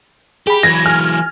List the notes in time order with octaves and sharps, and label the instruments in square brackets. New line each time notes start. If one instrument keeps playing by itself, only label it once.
[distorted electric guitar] G4 [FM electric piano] G#4 B5
[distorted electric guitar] E3 F#3 [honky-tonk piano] G#6 A#6
[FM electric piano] G#5 [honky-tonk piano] F6